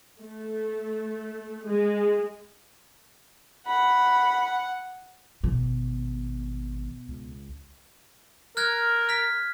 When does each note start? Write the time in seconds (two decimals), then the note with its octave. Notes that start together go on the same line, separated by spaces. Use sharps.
0.20 A3
1.65 G#3
3.67 F#5 B5
5.44 G#1 B2
7.09 C#2
8.57 A#4 F6 F#6 G#6
9.09 F6 B6